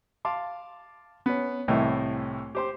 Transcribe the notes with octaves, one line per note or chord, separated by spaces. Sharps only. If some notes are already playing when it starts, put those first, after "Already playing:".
F5 A5 C6 D6
B3 C#4
C2 A2 E3 E4 D#5 G5
G4 C5 C6